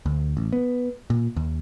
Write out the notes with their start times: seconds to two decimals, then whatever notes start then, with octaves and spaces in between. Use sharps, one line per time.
0.06 D2
0.37 A1
0.53 B3
1.10 A#2
1.36 D#2